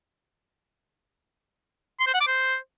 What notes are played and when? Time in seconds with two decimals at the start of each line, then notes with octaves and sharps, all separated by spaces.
2.00 C6
2.07 C5
2.14 F#5
2.21 D6
2.28 C5